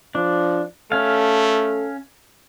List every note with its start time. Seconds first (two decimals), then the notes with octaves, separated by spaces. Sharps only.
0.15 F3 D4
0.92 A3 C#4 A4 F5